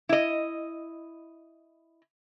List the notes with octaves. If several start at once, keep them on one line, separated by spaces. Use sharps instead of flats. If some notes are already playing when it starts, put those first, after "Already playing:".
E4 D#5